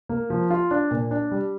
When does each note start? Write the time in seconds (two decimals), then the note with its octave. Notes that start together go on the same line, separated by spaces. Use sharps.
0.09 A#3
0.30 F3
0.50 F4
0.71 D4
0.91 A#2
1.11 D4
1.31 G3